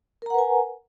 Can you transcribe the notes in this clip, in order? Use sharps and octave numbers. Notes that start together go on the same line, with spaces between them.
A#4 B4 F#5 G#5 A#5